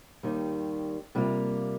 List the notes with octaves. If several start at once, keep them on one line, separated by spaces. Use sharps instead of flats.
D#2 D#3 G3
C3 G3 A#3 F4